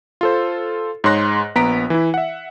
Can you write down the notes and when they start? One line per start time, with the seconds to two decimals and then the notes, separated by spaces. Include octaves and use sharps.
0.21 F4 A4 C5
1.04 G#2 G#4 C#5 C6 F#6 A#6
1.55 A#1 B3 A#5 B6 D7
1.90 E3 E4
2.14 E5 F#5